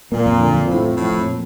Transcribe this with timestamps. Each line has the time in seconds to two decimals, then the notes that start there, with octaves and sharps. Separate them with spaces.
0.12 A#2 A#3
0.26 F2
0.41 D3
0.54 F2
0.68 A2 F3
0.82 F2
0.96 A2 F3
1.11 F2
1.25 A#2